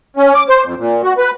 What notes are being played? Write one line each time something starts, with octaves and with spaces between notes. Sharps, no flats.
C#4
D6
C5
F2
A#2
F#4
B4